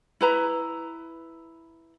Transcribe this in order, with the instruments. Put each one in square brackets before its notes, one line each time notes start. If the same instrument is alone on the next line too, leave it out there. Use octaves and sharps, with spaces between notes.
[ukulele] E4 B4 A#5